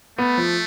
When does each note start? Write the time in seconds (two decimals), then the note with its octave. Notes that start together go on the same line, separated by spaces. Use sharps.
0.18 A3 B3
0.37 F3